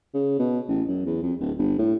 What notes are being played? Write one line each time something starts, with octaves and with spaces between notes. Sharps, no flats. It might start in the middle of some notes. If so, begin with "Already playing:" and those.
C#3
B2
A1
F#2
E2
F2
D1
G1
A2